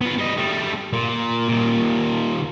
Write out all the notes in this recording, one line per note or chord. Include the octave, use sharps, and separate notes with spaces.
B3 F4
G3 D#5
G3 A3
A#2
D#2 A#2